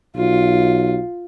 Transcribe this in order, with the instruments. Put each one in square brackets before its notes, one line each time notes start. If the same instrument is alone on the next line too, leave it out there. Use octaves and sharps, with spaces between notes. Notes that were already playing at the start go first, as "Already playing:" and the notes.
[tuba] B1 [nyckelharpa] F4